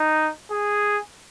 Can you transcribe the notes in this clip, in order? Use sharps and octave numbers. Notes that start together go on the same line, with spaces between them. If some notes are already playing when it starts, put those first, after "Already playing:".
Already playing: D#4
G#4